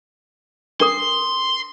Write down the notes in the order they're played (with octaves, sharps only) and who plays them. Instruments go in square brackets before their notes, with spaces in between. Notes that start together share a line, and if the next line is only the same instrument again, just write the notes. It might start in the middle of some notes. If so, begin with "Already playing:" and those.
[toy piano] D4 A#4 D#6 [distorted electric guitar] C6